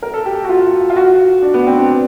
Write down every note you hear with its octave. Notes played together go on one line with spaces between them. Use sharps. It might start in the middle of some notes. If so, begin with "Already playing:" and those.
A#4
A4
G4
F#4
F4
F4
F#4
D4
B3
C4
D4